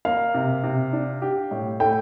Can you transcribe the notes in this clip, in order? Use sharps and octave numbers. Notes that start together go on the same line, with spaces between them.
A#3 F5
C3
C3
D4
G4
A2
A3 G5